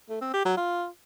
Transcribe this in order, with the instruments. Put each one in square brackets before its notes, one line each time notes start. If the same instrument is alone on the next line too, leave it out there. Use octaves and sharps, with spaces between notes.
[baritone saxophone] A3
C4
G4
F#3
F4